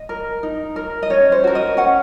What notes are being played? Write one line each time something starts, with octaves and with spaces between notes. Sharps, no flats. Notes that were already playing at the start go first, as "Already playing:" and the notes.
Already playing: D#5
A#4
D#4
A#4
D#5
C#4 C#5
C5
F#4 A#4
D#5
C#4 F#5